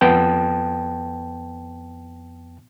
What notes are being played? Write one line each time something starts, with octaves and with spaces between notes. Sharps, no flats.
F2 B3 G5 A5